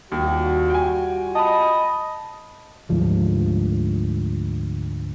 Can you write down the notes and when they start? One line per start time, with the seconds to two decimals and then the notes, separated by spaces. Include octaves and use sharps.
0.12 D#2 G3 F4 F#4
0.70 G5 G#5
1.35 D#5 A5 B5
2.89 D2 G#2 F3 G3